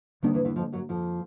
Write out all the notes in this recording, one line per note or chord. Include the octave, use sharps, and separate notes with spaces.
D#2 D3 D#3 G3 A#3 D4
E2 E3
E2 E3
F2 F3
F#2 F#3
F2 F3